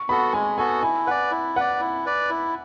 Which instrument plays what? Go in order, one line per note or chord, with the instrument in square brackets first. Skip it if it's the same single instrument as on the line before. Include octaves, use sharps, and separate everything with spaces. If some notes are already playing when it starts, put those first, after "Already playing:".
Already playing: [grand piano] C#6
[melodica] B3 F#4 A4 [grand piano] B5
[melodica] G#3 [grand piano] G#5
[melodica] B3 F#4 A4 [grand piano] G#5
[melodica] E4 [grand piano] G#5
[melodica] B4 D5 [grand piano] F#5
[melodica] E4
[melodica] B4 D5 [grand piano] F#5
[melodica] E4
B4 D5
E4